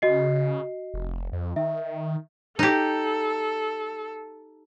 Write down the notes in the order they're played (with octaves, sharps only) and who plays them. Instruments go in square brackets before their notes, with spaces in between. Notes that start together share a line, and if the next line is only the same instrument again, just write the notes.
[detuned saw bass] C#3 [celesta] F#4 D#5 C7
[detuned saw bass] F1
F2
[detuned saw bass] D#3 [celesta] E5
[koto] D#4 G4 [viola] A4